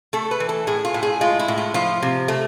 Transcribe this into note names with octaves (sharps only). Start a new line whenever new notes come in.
A3 A4
B4
E3
A4
A2 G#4
F4
A2
G#4
G#3 F4
E4
A2
F4
F3 F4
C3
A3